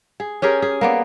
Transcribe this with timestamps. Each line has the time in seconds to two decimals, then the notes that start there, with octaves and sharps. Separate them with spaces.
0.20 G#4
0.42 C#4 G4 G#4 A#4
0.62 G#4
0.81 A#3 B3 D5